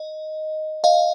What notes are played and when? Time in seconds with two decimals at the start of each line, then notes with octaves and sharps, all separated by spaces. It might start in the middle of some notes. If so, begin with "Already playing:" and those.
Already playing: D#5
0.84 D#5 F5